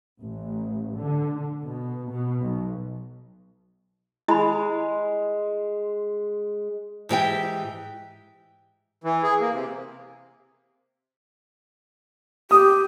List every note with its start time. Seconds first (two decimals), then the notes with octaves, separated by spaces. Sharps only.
0.19 A1
0.95 D3
1.61 B2
2.10 B2
2.41 B1
4.28 G#3 E4 B5
7.09 G#2 E3 G4 G5
9.04 E3
9.23 G#4
9.41 A#3
9.53 C3
12.51 G4 D#6